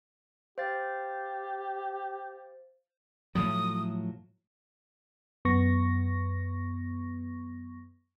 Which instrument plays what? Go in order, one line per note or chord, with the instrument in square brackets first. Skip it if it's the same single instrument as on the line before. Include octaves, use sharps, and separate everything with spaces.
[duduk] G4 [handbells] C5 F5 A6
[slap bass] A2 F3 F#3 [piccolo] D#6
[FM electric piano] F#2 B3 C#6 A#6